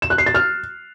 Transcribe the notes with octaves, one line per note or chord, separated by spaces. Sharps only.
E7
F#6
C7
A6
F6